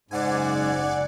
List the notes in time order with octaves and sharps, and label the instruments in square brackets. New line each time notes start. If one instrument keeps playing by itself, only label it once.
[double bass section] F#1 C#3 [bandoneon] G#2 [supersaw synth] D5 F#5 G#5